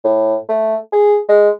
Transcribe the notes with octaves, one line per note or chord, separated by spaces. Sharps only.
A2
A3
G#4
G#3